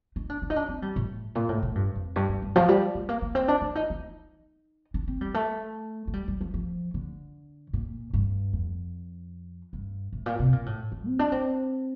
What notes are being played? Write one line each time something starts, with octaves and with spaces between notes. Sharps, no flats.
D#4
D4
D4
D#4
D4
C4
G3
A2
A#2
A2
A2
G2
F2
G2
G2
G2
F3
G3
A3
A#3
A#3
C4
D4
D4
D#4
D#4
D4
C4
G3
A3
A3
G3
G3
F3
F3
D3
A#2
G2
F2
G2
A2
A#2
C3
A#2
A2
D#3
C4
D4
C4